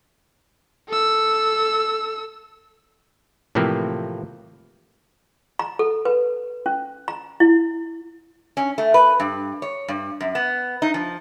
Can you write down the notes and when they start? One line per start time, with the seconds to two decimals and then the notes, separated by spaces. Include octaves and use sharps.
0.88 A4 E6
3.55 A2 C3 E3 F3 A#3 C4
5.59 A#5
5.79 A4
6.05 B4
6.66 C#4
7.08 A#5
7.40 E4
8.57 C#4
8.78 A3
8.94 B4
9.20 G2
9.62 C#5
9.88 G2
10.20 F#2
10.35 B3
10.82 D#4
10.94 F3